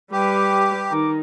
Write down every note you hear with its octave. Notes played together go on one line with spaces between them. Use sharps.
G3 G4 B4 D6
D#3 D#4 D6